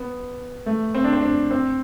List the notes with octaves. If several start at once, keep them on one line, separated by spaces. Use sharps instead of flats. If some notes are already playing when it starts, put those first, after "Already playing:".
Already playing: B3
A3
C4
D4
C4
D4
C4